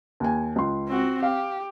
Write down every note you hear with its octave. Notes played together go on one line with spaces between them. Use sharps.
D#2 G#5
C#2 C6
C4 F#4
G4 F5